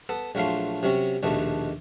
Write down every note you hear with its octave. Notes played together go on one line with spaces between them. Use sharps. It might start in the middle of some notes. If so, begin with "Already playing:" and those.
B3 A4
A#1 F#3 A3 F4 C6
C3 F#3 C#4
A#1 D#2 B2 A3